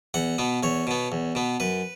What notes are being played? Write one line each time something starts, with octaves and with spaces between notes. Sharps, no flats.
E2 F#5
B2 B3
E2 C#5
B2 B3
E2
B2 B3
F#2 B4